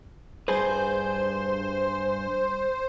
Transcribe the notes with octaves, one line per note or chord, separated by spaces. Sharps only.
G2 G#4 B4 C5